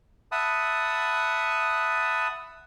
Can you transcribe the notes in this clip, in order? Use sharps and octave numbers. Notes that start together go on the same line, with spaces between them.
E5 F#5 A5 B5 D#6